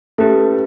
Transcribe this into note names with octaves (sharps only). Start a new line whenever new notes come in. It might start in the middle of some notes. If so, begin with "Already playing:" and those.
A3 C#4 E4 G4 B4